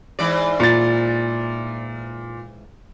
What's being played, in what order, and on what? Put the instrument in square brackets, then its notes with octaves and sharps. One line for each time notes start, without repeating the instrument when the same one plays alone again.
[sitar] G#2 E3 D5
[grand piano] A#2 A6